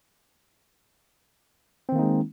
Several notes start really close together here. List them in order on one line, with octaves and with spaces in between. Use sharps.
C4 D#3 A#3 D#4 G#3